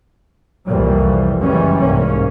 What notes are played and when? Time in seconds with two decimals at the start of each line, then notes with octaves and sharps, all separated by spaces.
0.66 C2 F2 E3 F3 G3 A#3
1.41 F#1 E3 G3 G#3 C#4
1.79 C2 G#2 A#3 C#4